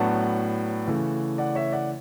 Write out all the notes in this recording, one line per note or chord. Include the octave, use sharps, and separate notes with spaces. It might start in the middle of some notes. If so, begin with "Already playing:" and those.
Already playing: A2 F#3 B3 D4 F#5 A5
C#3 E3 A3
D5 F#5
C#5 E5
D5 F#5